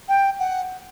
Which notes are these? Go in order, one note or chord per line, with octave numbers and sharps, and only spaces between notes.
G5
F#5